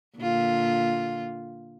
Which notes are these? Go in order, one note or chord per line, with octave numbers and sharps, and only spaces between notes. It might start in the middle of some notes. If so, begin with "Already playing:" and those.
A#2 D3 F4